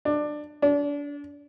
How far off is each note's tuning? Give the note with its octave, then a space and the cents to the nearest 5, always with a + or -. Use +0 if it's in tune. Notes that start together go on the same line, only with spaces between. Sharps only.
D4 +20
D4 -30